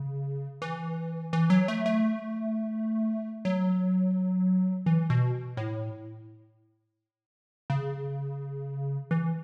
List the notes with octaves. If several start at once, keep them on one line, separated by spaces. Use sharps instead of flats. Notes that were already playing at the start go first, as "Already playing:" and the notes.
Already playing: C#3
E3
E3
F#3
A3
A3
F#3
E3
B2
A2
C#3
E3